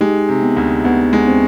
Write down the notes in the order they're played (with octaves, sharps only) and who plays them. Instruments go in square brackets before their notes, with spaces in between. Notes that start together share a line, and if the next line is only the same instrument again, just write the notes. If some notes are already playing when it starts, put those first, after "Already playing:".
[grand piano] G#3 [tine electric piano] D#4 G4
[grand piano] C3
[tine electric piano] B3
[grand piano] D2
[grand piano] D2 [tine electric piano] B3
[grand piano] G#3
[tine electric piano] C4